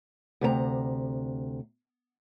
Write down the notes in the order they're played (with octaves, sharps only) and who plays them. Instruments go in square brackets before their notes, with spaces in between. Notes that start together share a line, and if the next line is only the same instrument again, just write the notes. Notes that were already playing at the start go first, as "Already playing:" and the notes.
[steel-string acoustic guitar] D2 C3 B4 A#5